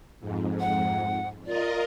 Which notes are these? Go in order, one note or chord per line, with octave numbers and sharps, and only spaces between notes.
F2 G#2
F#5
F4 A#4 D5 D#5